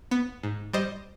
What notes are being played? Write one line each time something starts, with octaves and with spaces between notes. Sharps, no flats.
B3
G#2
G3 C5 D#5